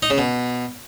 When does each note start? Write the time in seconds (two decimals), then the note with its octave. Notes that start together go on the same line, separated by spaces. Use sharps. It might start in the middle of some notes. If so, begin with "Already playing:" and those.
0.03 D#4
0.10 C#3
0.18 B2